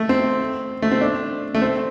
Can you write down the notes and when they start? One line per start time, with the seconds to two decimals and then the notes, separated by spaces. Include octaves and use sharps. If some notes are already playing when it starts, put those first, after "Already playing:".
Already playing: A3
0.09 C4
0.82 A3
0.91 C4
1.01 D4
1.54 A3
1.62 C4